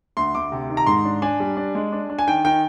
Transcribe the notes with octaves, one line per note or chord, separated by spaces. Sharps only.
D2 C6
D2 D6
C3
D#3
A#5
G#2 C6
D4
D4 G#5
G3
D4
G#3
D4
D4
G#5
D#3 G5
D#3 G5